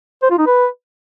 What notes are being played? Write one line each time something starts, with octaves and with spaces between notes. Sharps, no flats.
C5
F4
D#4
B4